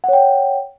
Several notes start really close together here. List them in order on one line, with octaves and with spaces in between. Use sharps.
F#5 C#5 G5